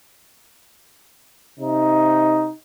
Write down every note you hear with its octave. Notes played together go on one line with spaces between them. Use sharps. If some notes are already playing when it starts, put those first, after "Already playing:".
C3 D#4